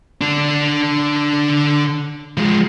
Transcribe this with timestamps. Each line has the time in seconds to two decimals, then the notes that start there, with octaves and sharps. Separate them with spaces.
0.21 D3 D4
2.37 F3 G#3